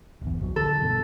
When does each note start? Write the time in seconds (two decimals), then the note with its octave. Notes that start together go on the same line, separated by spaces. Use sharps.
0.21 D1 G1 E2
0.39 A#1 F2 F#3
0.56 D3 F3 A4
0.81 G2 B2